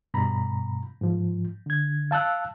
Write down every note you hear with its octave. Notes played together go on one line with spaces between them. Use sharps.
G2 B2 A#5 B5
G#2 F3
D3 G#6
F5 A5 E6 F#6